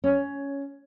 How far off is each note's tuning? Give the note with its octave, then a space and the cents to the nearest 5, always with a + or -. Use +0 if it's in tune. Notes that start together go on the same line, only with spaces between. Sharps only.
C#4 +10